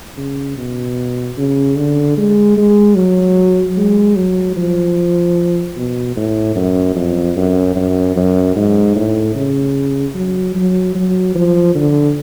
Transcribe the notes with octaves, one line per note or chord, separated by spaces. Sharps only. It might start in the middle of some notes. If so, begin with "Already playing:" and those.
C#3
B2
C#3
D3
G#3
G#3
F#3
G#3
F#3
F3
B2
A2
F#2
F2
F#2
F#2
F#2
G#2
A2
C#3
F#3
F#3
F#3
F3
D3